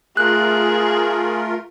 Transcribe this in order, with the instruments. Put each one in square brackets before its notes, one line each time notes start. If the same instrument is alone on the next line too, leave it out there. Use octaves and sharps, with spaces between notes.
[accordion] A3 F4 A#4 [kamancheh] G#4 [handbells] F#6